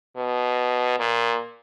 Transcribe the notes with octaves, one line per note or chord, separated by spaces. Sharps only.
B2
A#2